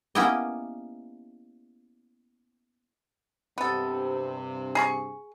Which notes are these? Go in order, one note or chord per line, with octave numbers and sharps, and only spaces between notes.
A#3 B3 C#4 E4 G4 D#5
G2 C3 B3 A4
G#4 A#5 C#6